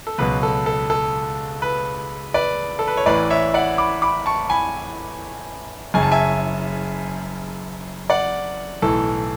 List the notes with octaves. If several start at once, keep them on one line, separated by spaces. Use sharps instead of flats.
A4
C#2 B2 F#3 B4
A4
A4
A4
B4
B4 D5
A4
B4
C#5
A1 A2 E3 B4 D5
C#5 E5
D5 F#5
B5 D6
B5 D6
A5 C#6
G#5 B5
F#1 F#2 C#3 G#5
A5
E5 G#5
D5 F#5
B1 A2 E3 A4